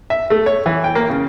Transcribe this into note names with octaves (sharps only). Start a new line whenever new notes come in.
E5
A3
C#5
E3
G5
A#3
C#3